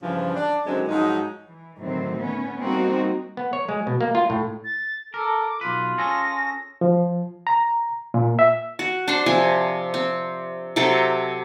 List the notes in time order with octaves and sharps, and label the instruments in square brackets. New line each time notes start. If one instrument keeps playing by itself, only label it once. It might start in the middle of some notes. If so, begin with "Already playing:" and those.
[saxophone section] G2 C#3 E3 F3
D4
F#2 D3 D#3 F#3 G#3 C4
G#2 F3 F#3 D#4
[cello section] E3
A2 D3 D#3 F#3 C4
B3 C#4
G3 A#3 C4 D#4 F#4
[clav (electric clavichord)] B3
C#5
G#3
B2
A#3
F4
A2
[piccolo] A6
[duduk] A4 [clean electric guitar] A#4 [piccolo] D6
[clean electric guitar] B1 B4 [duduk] F4
[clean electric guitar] C#4 G#4 A4 [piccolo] A#6
[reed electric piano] F3
A#5
A#2
E5
[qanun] F#4
D4 C5
C3 F3 G#5
C4
C3 F#3 A4 G5